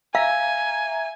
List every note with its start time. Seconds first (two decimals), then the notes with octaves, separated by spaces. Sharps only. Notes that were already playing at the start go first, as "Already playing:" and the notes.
0.15 E5 F5 G#5 A#5